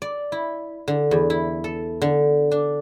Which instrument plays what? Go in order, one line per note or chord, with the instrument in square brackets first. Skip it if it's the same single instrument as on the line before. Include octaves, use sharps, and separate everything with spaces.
[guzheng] D5
E4
D3
E2
E4
A4
D3
D4